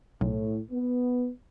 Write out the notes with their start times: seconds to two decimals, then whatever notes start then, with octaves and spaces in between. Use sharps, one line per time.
0.21 B1 A2
0.72 B3